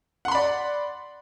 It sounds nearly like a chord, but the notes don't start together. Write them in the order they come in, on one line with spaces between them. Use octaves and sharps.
F#5 C6 B5 D5